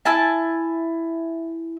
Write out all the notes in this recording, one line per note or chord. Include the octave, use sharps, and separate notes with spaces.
E4 G#5 A5